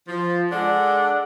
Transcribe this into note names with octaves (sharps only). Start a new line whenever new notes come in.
F3
G#3 D4 A4 F#5